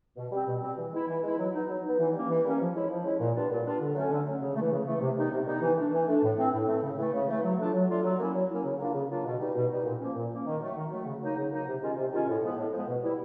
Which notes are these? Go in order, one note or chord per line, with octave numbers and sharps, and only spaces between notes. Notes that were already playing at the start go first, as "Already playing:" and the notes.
B2
G3 C4
B2
G3 C4
E3
G#3 B3 E4
E3
G#3 B3 E4
F#3
B3 D#4
F#3
B3 D#4
E3
G3 A#3 C#4
E3
G3 A#3 C#4
F3
G#3 C#4 E4
F3
G#3 C#4 E4
A#2
G3 B3 D4 F4
A#2
G3 B3 D4 F4
D3
F#3 A3 C#4
D3
F#3 A3 C#4
C#3
A3
E3
C#3
E3 A3
C3
D#3 G3 B3 D#4
C3
D#3 G3 B3 D#4
E3
A3 D4
E3
A3 D4
A2
E3 A3 C4
A2
E3 A3 C4
C#3
E3 A3
C#3
E3 A3
F#3
A3 D4 F4
F#3
A3 D4 F4
F#3
A#3 C#4 E4
F#3
A#3 C#4 E4
C#3
F#3 A#3 D4 F4
C#3
F#3 A#3 D4 F4
B2
G3 B3 D#4
B2
G3 B3 D#4
A#2
F3 A#3 C#4
A#2
F3 A#3 C#4
D#3
F#3 A3
D#3
F#3 A3
C#3
F#3 A#3 D#4
C#3
F#3 A#3 D#4
C3
D#3 G#3 C#4 F4
C3
D#3 G#3 C#4 F4
A2
F3 G#3 B3
A2
F3 G#3 B3
B2
G3 B3 E4